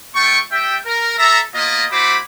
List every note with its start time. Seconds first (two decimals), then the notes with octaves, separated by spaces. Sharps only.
0.15 A3 F4 G5 C#6
0.52 G3 E5 G5
0.86 A#4
1.18 A4 E5 A#5
1.54 A#3 B3 F4 D#5
1.91 A3 E4 F#4 C5 B5 D6